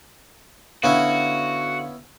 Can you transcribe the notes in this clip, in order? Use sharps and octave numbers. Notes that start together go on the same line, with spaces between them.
D3 B3 C#4 E4 F#4 F5